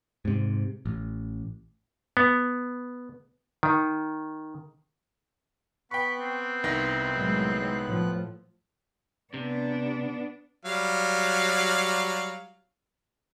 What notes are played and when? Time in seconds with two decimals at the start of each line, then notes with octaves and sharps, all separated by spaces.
0.25 G#2 C3
0.86 A1
2.17 B3
3.63 D#3
5.91 B3 G5 B5 C#6 F#6
6.20 C4
6.64 C2 D#3 A#6
7.14 A2 F#3 G#3
7.84 A2 F3
9.34 C3 B3 D4
10.65 F#3 G3 F5